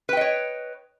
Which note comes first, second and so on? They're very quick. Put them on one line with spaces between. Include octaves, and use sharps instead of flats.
B4 G5 D#5 C#5